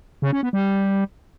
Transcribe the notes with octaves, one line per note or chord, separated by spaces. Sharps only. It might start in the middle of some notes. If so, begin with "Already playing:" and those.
C#3
C#4
B3
G3